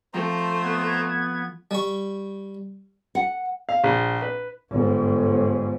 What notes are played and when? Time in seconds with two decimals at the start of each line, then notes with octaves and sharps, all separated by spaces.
0.14 F3 A3 C4 C5 A#5 C6
0.62 B3 G#6
1.71 G3 C#6
3.15 F#5
3.69 F5
3.84 A#1
4.22 B4
4.71 G1 G#2